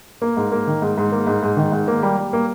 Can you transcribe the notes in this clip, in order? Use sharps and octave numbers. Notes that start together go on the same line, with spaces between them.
A#3
G#2
A#3
D#3
G#2
G#2
A#3
G#2
G#2
D#3
G#2
A#3
G3
G3
A#3